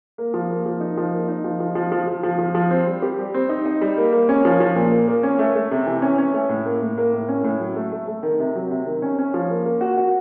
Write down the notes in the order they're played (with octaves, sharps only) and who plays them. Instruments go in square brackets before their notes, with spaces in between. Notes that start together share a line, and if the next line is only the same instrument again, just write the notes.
[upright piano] A#3
F3
A#3
F3
D#4
F3
A#3
D#4
F3
F3
F3
F3
F3
F3
F3
F3
C4
G3
G4
G3
C4
D#4
D#4
G3
A#3
A#3
C#4
F3
F3
A#2
A#3
A#3
C#4
A3
A3
C3
E3
C#4
C#4
A3
A2
A#3
A2
A#3
A2
C#4
A2
F#3
A3
A3
A3
D#3
C3
F#3
C3
D#3
C#4
C#4
F3
A#3
A#3
F#4
F#4